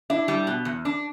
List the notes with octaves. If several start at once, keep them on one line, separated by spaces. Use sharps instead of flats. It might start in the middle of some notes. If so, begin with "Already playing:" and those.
D4 E4 E5
G3
B2
E2
D4